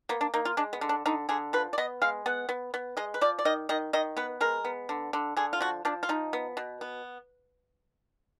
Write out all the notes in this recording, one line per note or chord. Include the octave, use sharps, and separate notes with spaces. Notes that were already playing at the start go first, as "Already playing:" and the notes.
A#3 B3
D4
A#3 D#4
F4
G#3 D4
B3
D3
D4
D3 D#4
D3 G#4
F3 B4
D5
B3 D#5
G#3 F5
B3 F#5
B3
B3
G#3 D#5
B4
F3 D5
D5
D#3 D#5
D#3 D#5
D#3 D#5
B3 B4
G#3 A#4
B3
D3
D3
D3 G#4
F4
F3 F#4
F3 D4
F4
F3 D#4
B3
B2
B3